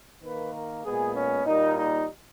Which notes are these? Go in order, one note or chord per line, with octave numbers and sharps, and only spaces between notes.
D#3 A#3 B4
A#4
A#2 G#3 B3 G#4
C#4
A#2 G3 A#3 D#4
D#4